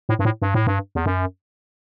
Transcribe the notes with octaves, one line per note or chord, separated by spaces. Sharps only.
A2
G2
A2
G2
A2
G2
E2
F#2